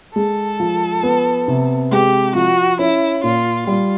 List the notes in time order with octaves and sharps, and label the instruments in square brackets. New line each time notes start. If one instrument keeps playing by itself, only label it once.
[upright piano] G#3 [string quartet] A4
[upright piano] F3
B3
C3
[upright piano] G#3 [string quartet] G4
[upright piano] F3 [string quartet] F#4
[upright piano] C#4 [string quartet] E4
[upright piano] A#2 [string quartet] F4
[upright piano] G3 [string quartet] F4